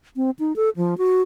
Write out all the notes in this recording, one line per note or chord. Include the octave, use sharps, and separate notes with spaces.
C4
D#4
A4
F3
F#4